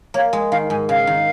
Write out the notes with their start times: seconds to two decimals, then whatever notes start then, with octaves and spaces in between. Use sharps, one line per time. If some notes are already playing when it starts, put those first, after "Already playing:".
0.14 A#3 C#5
0.33 G#3
0.51 D#3 F5
0.70 G#2 G#5
0.89 C#3 F5
1.07 D#3